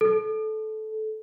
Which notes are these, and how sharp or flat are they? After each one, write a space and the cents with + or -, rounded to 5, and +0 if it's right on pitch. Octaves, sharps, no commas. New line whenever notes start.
A4 -20